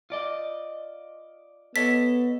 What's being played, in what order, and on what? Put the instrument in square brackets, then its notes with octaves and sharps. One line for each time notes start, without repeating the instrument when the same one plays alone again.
[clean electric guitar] F4 D5 D#5
[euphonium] B3 [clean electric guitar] A4 C#5 D#5 [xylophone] B6